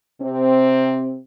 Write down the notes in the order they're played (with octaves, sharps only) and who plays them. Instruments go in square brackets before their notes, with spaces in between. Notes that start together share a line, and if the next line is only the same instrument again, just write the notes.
[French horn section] C3 C4